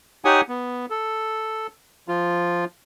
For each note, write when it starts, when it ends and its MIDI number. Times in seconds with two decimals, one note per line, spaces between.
0.25 0.41 63
0.25 0.41 67
0.25 0.41 73
0.25 0.41 78
0.25 0.41 80
0.25 0.41 87
0.49 0.86 59
0.90 1.67 69
2.08 2.65 53
2.08 2.65 65